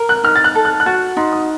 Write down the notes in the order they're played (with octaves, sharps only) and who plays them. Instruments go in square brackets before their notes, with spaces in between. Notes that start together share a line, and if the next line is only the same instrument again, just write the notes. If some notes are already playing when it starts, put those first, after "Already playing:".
Already playing: [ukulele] A#4
[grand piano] F#6
[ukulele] D#4 [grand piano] F6
[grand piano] A6
F#6
[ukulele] A4
[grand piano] F#6
F#6
[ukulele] F#4 [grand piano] A6
[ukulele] D#4 [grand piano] C6
[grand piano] D#6